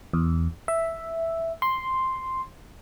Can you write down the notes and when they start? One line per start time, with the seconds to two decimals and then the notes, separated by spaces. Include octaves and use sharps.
0.13 E2
0.68 E5
1.62 C6